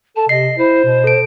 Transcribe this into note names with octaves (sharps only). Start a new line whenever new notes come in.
A4 A5
C3 D#5 C7
E4 C5
B2
A4 D7